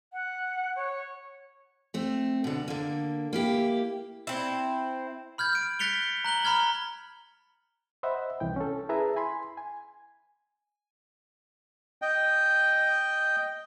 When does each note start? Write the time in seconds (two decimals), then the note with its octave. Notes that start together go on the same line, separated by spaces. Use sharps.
0.13 F#5
0.76 C#5
1.94 A3 C4
2.44 B2 D3
2.68 D3 A#3
3.33 A#3 E4 G4
4.27 C4 E4
5.38 B5 F6 G6 G#6
5.53 F6 D7
5.79 F#6 A6 B6 C#7 F7 G7
6.24 A#5 F#6 F#7 G7
6.44 A#5 B5 F6 G#6 G7
8.03 C5 D#5 E5 F#5 B5
8.40 C2 E3 G5
8.56 C#4 A4
8.89 E4 G#4 B4 E5 A5 A#5
9.16 G#5 B5 C6
9.57 G#5
12.02 D#5 G5